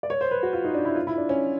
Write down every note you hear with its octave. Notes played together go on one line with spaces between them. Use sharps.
D5
C#5
C5
B4
F#4
F4
D#4
D4
E4
F4
E4
D4
C#4